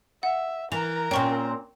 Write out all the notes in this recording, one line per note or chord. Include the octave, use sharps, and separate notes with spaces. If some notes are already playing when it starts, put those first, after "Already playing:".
E5 F#5
E3 A#4 A#5 F7
A#2 C4 C#4 G5 C#6